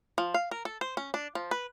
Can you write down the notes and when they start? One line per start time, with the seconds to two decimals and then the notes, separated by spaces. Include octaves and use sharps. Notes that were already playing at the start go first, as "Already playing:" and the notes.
0.18 F3
0.34 F5
0.51 A#4
0.65 A4
0.81 C5
0.97 C#4
1.14 D4
1.35 F3
1.51 B4